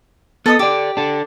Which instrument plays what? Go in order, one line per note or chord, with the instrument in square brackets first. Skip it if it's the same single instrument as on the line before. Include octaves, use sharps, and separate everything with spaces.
[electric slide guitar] B3 [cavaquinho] A4 D#5 D#6
[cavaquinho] G4 [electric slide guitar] A4 D5
[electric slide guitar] D4 A4